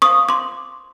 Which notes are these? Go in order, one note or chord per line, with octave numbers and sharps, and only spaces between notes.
C5 F5 C#6 D#6
C6 D6